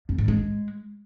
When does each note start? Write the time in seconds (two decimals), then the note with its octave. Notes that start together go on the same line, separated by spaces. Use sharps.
0.09 F2
0.18 G#2
0.28 G#3